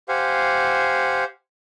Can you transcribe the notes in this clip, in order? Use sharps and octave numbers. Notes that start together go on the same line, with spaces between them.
G4 C5 F5 F#5 G#5